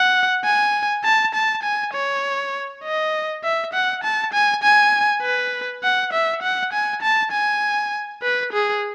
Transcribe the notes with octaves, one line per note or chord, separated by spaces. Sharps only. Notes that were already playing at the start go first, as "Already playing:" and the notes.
Already playing: F#5
G#5
A5
A5
G#5
C#5
D#5
E5
F#5
A5
G#5
G#5
B4
F#5
E5
F#5
G#5
A5
G#5
B4
G#4